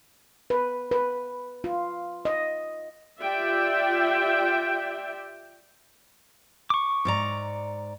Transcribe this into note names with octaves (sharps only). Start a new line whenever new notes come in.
B4
B4
F4
D#5
F4 G4 D5 E5 G5
C#6 D6
G#2 D5 A#5